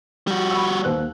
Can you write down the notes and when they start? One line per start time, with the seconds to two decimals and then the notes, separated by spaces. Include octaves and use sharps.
0.27 G3 F#4
0.50 B5 C#6 E6
0.84 D#2 C5 F#6